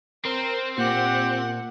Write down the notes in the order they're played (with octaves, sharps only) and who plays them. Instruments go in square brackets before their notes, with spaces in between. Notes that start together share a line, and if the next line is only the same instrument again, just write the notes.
[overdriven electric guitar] C4 [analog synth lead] A#4 [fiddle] C5
[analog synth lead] A#2 [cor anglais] G4 [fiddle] F#5